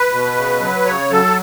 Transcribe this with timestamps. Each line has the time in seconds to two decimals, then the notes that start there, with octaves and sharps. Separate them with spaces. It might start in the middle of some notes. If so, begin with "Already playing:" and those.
Already playing: B4
0.12 B2
0.37 C#3
0.61 F#3
0.86 C#3 C#5
1.11 F#3 A4